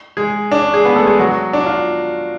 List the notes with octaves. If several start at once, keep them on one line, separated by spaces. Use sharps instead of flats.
G#3 G#4
D4
C#4
G#3 G#4
B3 B4
A3 A4
G#3 G#4
F#3 F#4
D4
F4